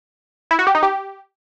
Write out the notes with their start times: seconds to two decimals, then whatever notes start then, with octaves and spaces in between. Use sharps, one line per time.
0.51 E4
0.59 F#4
0.67 G4
0.75 D#4
0.83 G4